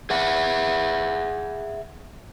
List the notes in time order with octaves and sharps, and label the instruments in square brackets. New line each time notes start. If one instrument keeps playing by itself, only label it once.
[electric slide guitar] G#4 E5 F#5